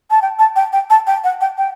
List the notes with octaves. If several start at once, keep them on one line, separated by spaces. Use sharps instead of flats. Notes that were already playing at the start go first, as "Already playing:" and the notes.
A5
G5
A5
G5
G5
A5
G5
F#5
G5
G5